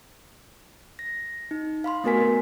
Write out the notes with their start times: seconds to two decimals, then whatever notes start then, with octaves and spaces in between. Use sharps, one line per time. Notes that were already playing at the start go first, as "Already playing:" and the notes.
0.99 A#6
1.51 D#4
1.84 F5 B5 C6
2.04 A3 B3 F#4 A#4 G#5 B6